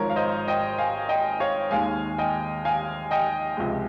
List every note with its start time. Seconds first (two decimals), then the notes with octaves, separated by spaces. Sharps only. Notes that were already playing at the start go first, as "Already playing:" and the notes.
Already playing: G#1 G#2 F3 A#4 C#5
0.10 F5
0.16 C5 D#5
0.48 D#5 G5
0.78 F5 G#5
1.09 D#5 G5
1.40 C#5 F5
1.71 D#2 D#3 G#3 F5 G#5
2.18 D#5 G5
2.65 F5 G#5
3.11 D#5 G5
3.57 C#2 C3 F3 G#3